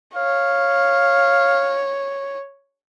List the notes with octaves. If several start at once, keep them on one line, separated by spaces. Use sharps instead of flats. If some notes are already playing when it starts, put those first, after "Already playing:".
C#5 F5